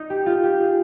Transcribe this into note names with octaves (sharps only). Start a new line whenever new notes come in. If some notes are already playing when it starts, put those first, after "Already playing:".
Already playing: D#4
G4
F4
G4
G#4